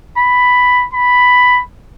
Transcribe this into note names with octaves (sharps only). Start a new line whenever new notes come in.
B5
B5